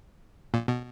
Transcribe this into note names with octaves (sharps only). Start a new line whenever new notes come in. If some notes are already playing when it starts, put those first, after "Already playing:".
A#2
B2